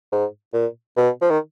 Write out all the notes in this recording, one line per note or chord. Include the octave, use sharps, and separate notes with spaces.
G#2
A#2
B2
F3
D#3